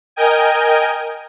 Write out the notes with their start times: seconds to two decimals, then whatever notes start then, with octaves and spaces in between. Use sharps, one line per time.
0.16 A#4 D#5 G5 G#5